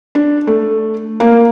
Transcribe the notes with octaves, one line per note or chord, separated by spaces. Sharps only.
D4
A3
A#3